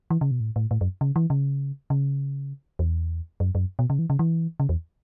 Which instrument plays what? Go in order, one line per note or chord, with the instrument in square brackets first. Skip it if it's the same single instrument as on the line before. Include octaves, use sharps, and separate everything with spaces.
[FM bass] E3
C#3
B2
A2
A2
A2
F#2
C#3
E3
C#3
C#3
E2
F#2
F#2
B2
C#3
E3
C#3
E3
C#3
E2